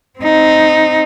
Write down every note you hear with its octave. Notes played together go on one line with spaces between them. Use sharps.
C4 D#4